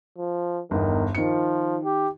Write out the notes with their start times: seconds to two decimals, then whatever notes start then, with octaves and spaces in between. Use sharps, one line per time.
0.18 F3
0.71 G1 E2 D#3
1.15 D#3 F3 C#7
1.85 G4